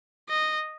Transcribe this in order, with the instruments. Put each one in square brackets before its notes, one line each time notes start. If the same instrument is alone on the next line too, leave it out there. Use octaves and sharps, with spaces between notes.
[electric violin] D#5